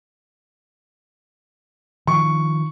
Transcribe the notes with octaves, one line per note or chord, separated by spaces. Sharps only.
D#3 F3 C#6